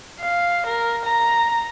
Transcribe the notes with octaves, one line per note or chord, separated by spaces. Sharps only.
F5
A#4
A#5